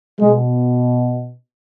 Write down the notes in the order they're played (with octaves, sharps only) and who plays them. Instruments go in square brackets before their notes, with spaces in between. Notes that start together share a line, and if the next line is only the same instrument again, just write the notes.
[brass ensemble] B2 G#3